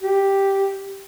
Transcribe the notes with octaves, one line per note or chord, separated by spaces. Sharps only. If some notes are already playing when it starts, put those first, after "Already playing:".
G4